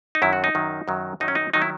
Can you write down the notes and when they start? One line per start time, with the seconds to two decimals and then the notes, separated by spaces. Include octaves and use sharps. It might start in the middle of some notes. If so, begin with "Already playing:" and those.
0.15 D#4
0.22 F#2 D#3 F#3 E4
0.33 F#4
0.44 D#4
0.55 F#2 D#3 F#3
0.88 F#2 D#3 F#3
1.20 F#2 D#3 F#3 D#4
1.28 C#4
1.35 D#4
1.54 D#3 F#3 D#4
1.62 E4